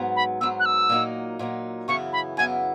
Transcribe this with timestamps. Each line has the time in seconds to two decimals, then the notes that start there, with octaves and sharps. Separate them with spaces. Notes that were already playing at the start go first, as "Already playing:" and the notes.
Already playing: G#2 F#3 B3
0.16 B5
0.41 G#2 F#3 B3 E6
0.60 F#6
0.66 E6
0.89 A#2 F#3 A#3 D#4
1.39 A#2 F#3 A#3 D#4
1.88 F#2 C#3 E3 B3 E4 C#6
2.13 B5
2.37 F#2 C#3 E3 B3 E4 G#5